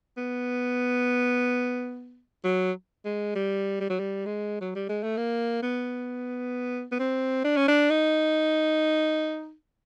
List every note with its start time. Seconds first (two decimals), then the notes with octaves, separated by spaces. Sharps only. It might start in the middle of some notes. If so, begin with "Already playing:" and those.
0.17 B3
2.44 F#3
3.05 G#3
3.35 G3
3.80 G3
3.90 F#3
3.99 G3
4.26 G#3
4.61 F#3
4.75 G3
4.89 G#3
5.03 A3
5.17 A#3
5.63 B3
6.92 B3
6.99 C4
7.44 D4
7.57 C#4
7.68 D4
7.90 D#4